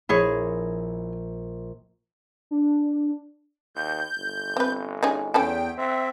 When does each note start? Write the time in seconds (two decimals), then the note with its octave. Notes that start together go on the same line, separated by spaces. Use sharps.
0.09 A#1 F3 E4 G#4 C#5 A#6
2.51 D4
3.76 D#2 G6
4.17 G1
4.57 C4 B4
5.03 C#4 D#4 G#4
5.34 E2 C#4 E4 A4 G5
5.78 C4 E5